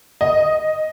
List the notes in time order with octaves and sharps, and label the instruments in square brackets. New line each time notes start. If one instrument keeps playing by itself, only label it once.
[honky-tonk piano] D#5